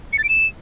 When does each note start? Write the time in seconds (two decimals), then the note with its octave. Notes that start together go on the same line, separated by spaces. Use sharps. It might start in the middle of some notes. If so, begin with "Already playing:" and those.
0.13 C#7
0.18 A6
0.24 D7
0.29 E7